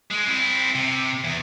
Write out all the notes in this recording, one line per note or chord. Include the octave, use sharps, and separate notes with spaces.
G#3
C4 E4
C3
E2